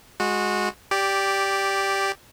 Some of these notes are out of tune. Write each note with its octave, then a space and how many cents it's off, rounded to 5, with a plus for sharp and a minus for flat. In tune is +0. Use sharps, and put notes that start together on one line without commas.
G#3 +0 F#4 -20
G4 +0 D5 -10